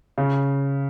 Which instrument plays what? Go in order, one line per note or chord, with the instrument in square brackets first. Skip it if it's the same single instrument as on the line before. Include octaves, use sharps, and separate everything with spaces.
[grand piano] C#3